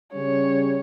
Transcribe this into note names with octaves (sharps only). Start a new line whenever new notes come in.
C#3 G3 C#4 C#5